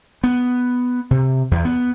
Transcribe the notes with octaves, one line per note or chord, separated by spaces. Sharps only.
B3
C3
E2
B3